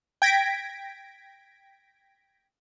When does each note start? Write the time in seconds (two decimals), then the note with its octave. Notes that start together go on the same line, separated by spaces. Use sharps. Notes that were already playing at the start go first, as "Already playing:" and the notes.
0.22 G5 G#6 A#6 B6 D7